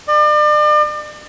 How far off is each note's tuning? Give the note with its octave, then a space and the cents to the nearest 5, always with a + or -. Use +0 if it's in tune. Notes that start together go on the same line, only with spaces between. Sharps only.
D5 +40